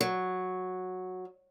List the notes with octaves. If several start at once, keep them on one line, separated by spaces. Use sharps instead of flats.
F#3